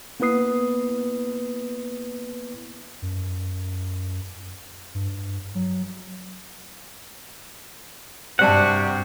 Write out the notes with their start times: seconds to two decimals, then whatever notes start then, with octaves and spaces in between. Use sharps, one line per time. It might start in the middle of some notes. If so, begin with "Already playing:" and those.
0.20 A#3 B3 E4 B4 D#6 C7
3.02 F#2
4.95 G2
5.55 F#3
8.39 G2 C3 G3 F#4 C5 D5 F#5 A5